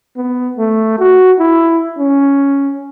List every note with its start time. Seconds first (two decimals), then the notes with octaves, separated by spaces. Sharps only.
0.16 B3
0.57 A3
0.99 F#4
1.39 E4
1.99 C#4